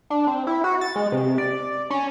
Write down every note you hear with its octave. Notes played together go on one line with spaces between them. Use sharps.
D4
C4
E4
F#4
A6
G#3
C3
D5
C#4